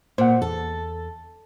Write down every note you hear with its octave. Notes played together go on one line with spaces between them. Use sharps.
A#2 C5 F#5
E2 A4